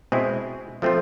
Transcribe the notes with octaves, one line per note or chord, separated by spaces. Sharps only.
B2 G#3 C4 E4 G#4
F3 A3 C4 F4